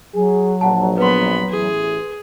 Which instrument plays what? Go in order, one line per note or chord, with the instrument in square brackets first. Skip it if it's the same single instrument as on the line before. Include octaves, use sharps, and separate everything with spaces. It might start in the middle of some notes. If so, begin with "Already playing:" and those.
[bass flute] F#3 [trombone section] G#4
[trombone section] A#1 [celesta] F#5 A5
[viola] B3 B5 [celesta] B4 C6
[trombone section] A1 E3 [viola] G#4